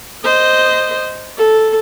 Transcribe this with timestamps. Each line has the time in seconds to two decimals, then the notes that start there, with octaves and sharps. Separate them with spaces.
0.24 C5 D#5
1.37 A4